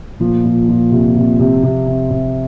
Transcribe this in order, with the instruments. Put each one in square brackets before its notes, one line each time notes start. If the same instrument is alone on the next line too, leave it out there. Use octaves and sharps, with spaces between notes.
[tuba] A#2 [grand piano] F3
[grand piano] F3
F3
C3
C3
C3
C3
C3
C3